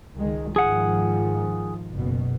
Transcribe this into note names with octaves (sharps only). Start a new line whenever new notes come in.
C#2 D#3 G#3
G#2 D#3 F3 G#4 F#5
F#1 B2